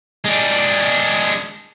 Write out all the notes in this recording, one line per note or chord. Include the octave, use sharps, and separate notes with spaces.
G#3 D4